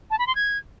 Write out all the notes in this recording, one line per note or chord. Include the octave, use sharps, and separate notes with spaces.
A5
B5
C6
G#6